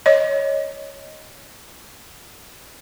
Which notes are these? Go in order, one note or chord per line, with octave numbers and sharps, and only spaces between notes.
C#5 D#5